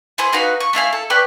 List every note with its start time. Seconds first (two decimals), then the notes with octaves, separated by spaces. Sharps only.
0.18 E4 G#4 C5
0.33 D#4 F#4 B4 F5
0.60 C#6
0.73 A3 E4 F5 G#5
0.93 A4
1.10 G4 B4 C#5 D5